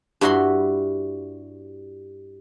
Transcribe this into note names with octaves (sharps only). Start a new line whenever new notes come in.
G2 E4 F#4 B5 C6